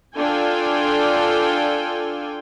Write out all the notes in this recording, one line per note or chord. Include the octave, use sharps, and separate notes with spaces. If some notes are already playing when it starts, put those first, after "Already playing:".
D4 F4 A4 D5 G5 G#5